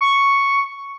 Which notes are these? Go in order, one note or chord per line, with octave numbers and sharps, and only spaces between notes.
C#6